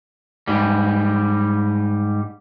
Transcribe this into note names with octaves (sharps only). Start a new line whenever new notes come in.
G#2 G3